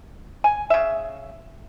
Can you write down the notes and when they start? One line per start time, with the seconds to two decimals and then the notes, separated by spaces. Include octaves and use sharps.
0.44 G#5
0.70 C#3 E5